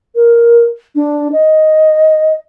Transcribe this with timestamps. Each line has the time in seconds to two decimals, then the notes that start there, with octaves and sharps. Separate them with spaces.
0.15 A#4
0.95 D4
1.33 D#5